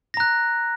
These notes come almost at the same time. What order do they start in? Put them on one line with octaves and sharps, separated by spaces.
A#6 A#5 F#6